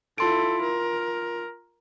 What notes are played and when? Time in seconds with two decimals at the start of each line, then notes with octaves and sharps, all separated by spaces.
0.18 E4 F4 A4 C6 D7
0.62 A#4